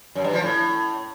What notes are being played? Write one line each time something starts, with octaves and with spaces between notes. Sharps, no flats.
F#2
G2
F3
A2